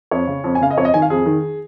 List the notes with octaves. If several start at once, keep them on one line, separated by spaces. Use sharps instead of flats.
F2 C#5
C#3
F2
G#5
C#3 F5
D#5
F2 C#5
D#5
D#3 G#5
F5
F2 G#4
D#3